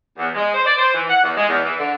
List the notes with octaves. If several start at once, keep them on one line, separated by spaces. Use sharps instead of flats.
E2
G#3
C5
D5
C5
E3
F#5
E2
G#3
E2
E3
D3